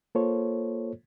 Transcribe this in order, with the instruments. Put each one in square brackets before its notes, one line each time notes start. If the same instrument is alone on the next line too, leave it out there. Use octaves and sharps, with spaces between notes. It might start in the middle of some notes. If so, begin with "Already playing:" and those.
[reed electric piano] A#3 F4 A4 C5 C#5